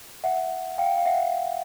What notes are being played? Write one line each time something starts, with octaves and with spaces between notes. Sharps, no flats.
E5 F#5
F5 G5
F5
E5 F#5